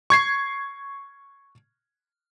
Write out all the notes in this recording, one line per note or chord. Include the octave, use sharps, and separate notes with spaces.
C#6 G#6 C7